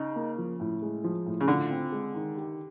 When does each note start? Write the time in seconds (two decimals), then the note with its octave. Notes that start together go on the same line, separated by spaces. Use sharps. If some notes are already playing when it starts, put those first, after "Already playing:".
Already playing: C#3 D#4
0.16 A#3
0.38 F3
0.60 A2
0.82 G#3
1.04 F3
1.26 A2
1.41 C#3
1.48 D3 F4
1.71 C4
1.92 G#3
2.15 D#3
2.37 G4